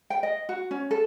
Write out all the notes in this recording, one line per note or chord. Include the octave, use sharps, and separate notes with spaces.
G5
D#5
F#4
C#4
A4